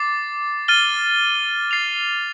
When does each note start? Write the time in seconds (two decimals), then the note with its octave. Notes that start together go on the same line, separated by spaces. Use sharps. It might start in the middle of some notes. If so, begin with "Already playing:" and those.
Already playing: D6 A6 C7
0.68 F6 A6 D#7 G7
1.71 A6 C7 F7